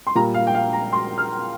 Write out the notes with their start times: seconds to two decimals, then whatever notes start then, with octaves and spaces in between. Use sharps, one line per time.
0.07 C6
0.15 A#2 G3 A#3 A#5
0.34 F5
0.47 G5
0.54 F5
0.73 A#5
0.92 C6
1.18 F6